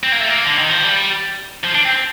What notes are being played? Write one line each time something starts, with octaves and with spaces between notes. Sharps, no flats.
C4
A#3
A3
A#3
D3
D#3
F3
G3
F3
D4
C4